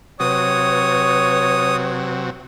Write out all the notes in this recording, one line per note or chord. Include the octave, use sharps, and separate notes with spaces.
C3 F#3 B4 C#5 D#6